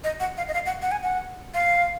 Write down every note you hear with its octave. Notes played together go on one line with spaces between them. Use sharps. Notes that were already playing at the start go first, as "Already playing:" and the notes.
D#5
F#5
F5
D#5
F5
F#5
F#5
G#5
F#5
F5